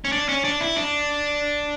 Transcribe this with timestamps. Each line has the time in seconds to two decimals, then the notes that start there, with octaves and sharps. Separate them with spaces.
0.05 C#4
0.12 D4
0.29 C#4
0.45 D4
0.61 E4
0.76 D4